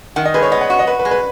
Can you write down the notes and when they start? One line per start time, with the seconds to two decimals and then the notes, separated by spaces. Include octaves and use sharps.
0.16 D#3 F#5
0.25 D#5
0.34 G#3 B4
0.42 C#5
0.52 B3 D#5
0.61 F#5
0.70 F#4
0.79 D#5
0.87 F#4 B4
0.99 B4
1.05 G#3
1.11 B4